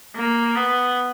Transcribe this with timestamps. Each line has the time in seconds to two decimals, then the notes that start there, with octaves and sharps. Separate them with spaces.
0.15 A#3
0.55 B3